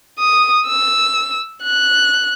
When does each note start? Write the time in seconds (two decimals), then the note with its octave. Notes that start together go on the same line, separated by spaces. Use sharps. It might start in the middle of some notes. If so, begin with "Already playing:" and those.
0.19 D#6
0.67 E6
1.63 F#6